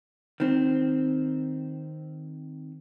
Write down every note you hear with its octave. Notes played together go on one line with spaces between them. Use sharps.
D#3 C4